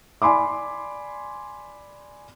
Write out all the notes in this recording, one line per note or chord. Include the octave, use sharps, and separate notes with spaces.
D5 G#5 B5 C6 D6